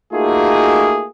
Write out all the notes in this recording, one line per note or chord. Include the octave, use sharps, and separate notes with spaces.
A3 A#3 D#4 F4 F#4 G#4